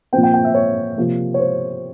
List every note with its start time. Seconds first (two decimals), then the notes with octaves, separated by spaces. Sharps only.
0.13 A#2 F3 C4 G5
0.23 G5
0.34 G5
0.45 E5
0.54 C#5
0.97 C3 F3 A#3
1.34 C#5
1.39 C5